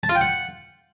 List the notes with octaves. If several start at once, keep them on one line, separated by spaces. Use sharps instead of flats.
A5
F4
G5
F#5